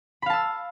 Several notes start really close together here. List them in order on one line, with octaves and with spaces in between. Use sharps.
B5 F5 A5 E6